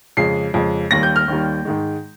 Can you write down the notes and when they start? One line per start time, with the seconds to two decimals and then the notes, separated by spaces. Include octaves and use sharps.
0.17 F2 C#3 G#3 C7
0.54 F2 C#3 G#3
0.91 D#2 D#3 G3 A#6
1.03 G6
1.16 F6
1.28 D#2 D#3 G3
1.65 G#2 D#3 G#3